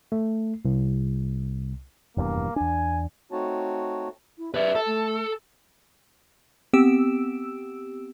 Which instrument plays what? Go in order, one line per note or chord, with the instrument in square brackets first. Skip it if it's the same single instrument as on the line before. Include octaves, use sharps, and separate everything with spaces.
[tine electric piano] A3
C2
[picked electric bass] F1 E2 G2 [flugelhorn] A#3
[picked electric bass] E2 D4 [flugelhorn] G#5
[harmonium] A3 C4 D#4 F#4 C#5 A5
[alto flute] E4
[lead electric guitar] B4 D5 [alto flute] E5
[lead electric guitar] A4
[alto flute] A3
[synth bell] B3 C4 G4 E6 D7 E7